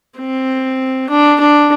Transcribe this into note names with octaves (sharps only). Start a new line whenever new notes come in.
C4
D4
D4